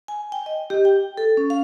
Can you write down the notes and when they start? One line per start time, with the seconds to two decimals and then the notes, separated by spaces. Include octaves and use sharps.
0.08 G#5
0.32 G5
0.46 D#5
0.70 G4
0.85 G5
1.18 A4
1.37 C#4
1.50 F5